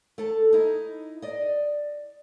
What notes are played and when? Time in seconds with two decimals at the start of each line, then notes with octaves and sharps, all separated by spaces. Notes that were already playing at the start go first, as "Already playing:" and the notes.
0.18 A3 A4
0.53 D#4 E4
1.22 D5 D#5